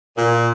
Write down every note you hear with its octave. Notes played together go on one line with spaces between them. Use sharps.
A#2